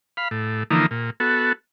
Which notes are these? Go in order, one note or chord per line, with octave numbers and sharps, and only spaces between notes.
F5 B5
A2
D3 E3 F3 A#3 D#4
A#2
B3 F#4 A4